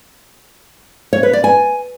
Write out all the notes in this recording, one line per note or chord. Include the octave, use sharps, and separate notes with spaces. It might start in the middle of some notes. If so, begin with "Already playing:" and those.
C#5
B4
D5
G#5